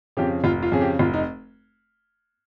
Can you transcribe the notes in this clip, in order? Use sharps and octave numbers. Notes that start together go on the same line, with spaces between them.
F2 C#3 G4
F1 F4
F4
F2 C#3 G#4
G4
F1 F4
D#4